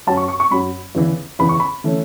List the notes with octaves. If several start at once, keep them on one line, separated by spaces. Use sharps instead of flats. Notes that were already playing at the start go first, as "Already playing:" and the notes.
F#2 F#3 C#4 A5
C#6
C#6
C#6
F#2 F#3 C#4 B5
E2 C#3 E3
E2 C#3 E3 B5
C#6
B5
E3 A3 C#4